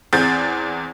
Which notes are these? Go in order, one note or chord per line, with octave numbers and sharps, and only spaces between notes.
E2 C4 G#4 G6 A6